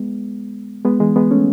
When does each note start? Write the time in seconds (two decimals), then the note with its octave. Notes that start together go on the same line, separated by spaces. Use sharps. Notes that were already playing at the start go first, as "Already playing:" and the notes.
Already playing: G#3 B3
0.85 G#3 B3
1.00 E3 G#3
1.16 G#3 B3
1.31 A3 C#4